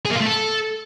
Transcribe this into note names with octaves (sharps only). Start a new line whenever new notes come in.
G#4
A#3
F4
A3
A4